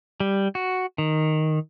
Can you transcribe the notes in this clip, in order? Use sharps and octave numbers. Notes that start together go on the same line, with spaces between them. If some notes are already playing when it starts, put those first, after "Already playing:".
G3
F#4
D#3